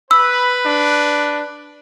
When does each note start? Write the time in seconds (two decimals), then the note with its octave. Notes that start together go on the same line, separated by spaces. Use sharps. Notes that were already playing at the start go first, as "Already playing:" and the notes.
0.11 B4 B5 E6
0.66 D4